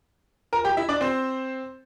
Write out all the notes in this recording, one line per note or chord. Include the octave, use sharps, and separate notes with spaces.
A#4 A#5
G4 G5
E4 E5
D4 D5
C4 C5